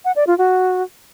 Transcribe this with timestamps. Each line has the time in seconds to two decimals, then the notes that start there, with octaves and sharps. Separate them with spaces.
0.05 F#5
0.16 D5
0.27 F4
0.38 F#4